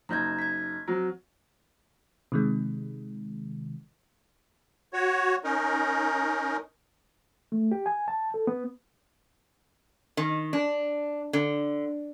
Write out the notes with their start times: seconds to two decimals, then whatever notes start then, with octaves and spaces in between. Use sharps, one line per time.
0.09 F#1 D#4 A#5 G6 G#6
0.39 G#6 B6
0.88 F#3 C4
2.32 C3 D#3 G#3
4.93 F#4 C#5
5.44 C#4 D#4 A#4
7.52 A3
7.71 G4
7.86 G#5
8.08 A5
8.34 A4
8.47 B3
10.17 D#3
10.53 D4
11.33 D3